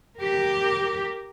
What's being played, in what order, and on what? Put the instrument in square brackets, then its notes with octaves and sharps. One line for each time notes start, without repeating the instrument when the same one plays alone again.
[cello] G4 A#4